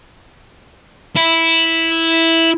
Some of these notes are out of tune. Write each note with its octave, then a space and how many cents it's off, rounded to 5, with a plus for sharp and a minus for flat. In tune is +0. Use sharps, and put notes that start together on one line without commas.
E4 -5